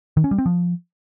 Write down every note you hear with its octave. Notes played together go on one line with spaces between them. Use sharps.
D#3
C#4
G3
C4
F3